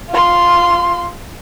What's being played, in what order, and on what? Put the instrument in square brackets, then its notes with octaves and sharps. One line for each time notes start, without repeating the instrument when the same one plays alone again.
[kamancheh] F4 C6